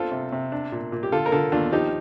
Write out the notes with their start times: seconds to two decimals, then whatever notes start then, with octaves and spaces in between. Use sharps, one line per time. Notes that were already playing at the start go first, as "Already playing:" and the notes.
Already playing: C4 D4 F4 A4
0.11 C3
0.32 C3
0.52 D4
0.72 A#2
0.92 A#2
1.03 G4
1.12 D3 F4 A4
1.26 A#4
1.32 D3 F4 A4
1.52 D#2 D4 F4
1.72 F3 D#4 G4